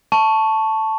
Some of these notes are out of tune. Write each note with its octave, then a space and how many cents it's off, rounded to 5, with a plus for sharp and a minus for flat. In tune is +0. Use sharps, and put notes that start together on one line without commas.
A5 +0 C#6 +0